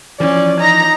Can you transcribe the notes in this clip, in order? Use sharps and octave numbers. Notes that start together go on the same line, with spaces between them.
E3 F3 C#4 D5
D#4 A#5 A#6